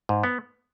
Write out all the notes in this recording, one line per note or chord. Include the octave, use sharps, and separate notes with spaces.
G#2
B3